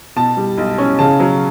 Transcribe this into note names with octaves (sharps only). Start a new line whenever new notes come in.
B2 A5
G3
B1
C#4
C#3 A5
F#3